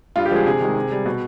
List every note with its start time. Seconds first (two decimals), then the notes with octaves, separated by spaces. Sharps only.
0.16 G2 F4
0.25 G4
0.31 D3 F3 G#3 G#4
0.46 C3 G#4
0.60 D#3 G#3
0.76 C3
0.91 G3
1.06 B2